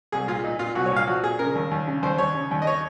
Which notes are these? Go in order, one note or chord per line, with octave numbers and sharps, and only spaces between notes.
C2 G#4
A#2 F4
A#2 D#4
A#2 F4
C2 F#4
C#5
A#2 F5
F3 F#4
A#2 G#4
C#3 A#4
D#2
D#2
C#3
D#2 C5
D#2 C#5
C#3
D#2
D#5
C#5